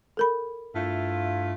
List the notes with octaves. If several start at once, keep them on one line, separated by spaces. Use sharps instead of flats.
A4 A#4 B5
G2 A3 E4 F4